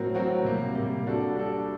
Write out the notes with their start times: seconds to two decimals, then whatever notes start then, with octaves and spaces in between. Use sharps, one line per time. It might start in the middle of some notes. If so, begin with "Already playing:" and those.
Already playing: A2 F#3 C4 F#4 A#4
0.14 A2 F#3 C4 F#4 A#4
0.45 C3 G3 A#3
0.75 C3 G3 A#3
1.05 G3 D4 F#4 A4
1.35 G3 D4 F#4 A4